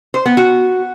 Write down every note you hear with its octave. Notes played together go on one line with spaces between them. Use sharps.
C5
B3
F#4